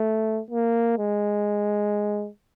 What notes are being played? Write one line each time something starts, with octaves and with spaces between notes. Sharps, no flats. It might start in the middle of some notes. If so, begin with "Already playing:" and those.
Already playing: A3
A#3
G#3